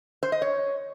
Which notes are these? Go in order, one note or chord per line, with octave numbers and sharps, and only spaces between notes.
C5
D#5
C#5